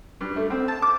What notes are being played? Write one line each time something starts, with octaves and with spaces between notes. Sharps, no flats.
G2
A3
C4
A5
D6